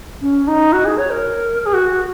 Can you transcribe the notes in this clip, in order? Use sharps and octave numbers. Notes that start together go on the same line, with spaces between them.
C#4
D#4
F#4
G#4
C#5
A#4
G#4
F#4